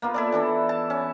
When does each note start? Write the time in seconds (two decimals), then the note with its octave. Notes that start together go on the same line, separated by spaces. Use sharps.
0.02 A#3 B3 F4
0.14 E4 A4 D5
0.32 E3 D4 A4
0.69 A5
0.90 C#4